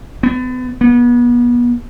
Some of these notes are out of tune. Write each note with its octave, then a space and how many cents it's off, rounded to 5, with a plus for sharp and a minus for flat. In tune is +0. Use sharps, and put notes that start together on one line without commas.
B3 +35
B3 -35